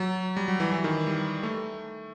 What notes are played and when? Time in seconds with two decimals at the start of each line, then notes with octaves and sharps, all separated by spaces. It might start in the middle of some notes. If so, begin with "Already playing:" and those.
Already playing: F#3
0.37 G3
0.48 F#3
0.60 E3
0.72 E3
0.84 D#3
1.07 G3
1.43 A3